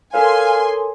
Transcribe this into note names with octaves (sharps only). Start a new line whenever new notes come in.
A4 A#4 C#5 F5 G#5 C6